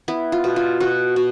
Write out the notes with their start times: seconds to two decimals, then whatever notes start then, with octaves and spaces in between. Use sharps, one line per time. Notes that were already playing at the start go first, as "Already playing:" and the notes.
0.08 B3 E4
0.32 F4
0.44 B2
0.56 F4
0.80 B2 F#4
1.16 B2